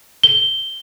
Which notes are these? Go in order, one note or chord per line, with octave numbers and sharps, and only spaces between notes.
G7